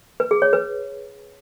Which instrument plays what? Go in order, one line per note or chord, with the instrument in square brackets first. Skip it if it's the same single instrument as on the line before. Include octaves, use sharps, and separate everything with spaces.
[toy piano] B4
G#4
C#5
B4